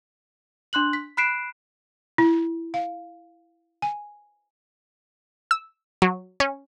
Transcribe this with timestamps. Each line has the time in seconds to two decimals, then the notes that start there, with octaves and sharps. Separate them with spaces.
0.73 D4 C6 F#6 F#7
0.93 B6
1.17 B5 F#6 B6 C7 D7 E7
2.18 E4
2.74 F5
3.82 G#5
5.51 E6
6.02 F#3
6.40 C#4